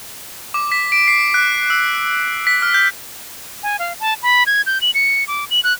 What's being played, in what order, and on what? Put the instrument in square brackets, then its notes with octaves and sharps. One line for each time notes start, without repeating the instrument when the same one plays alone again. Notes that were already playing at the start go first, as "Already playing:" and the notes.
[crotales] D6
B6
D7
C7
F#6
E6
B6
F6
G6
[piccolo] G#5
F5
A5
B5
G#6
G6
F#7
C#7
D6
F#7
F#6